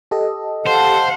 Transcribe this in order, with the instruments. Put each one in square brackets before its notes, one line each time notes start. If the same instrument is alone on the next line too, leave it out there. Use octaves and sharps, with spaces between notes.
[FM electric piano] G4 A4 D#5
[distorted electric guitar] C5 [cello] F5 F#5 [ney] A5